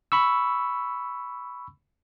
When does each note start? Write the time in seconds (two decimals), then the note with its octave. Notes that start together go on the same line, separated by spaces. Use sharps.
0.12 B5 C#6 E6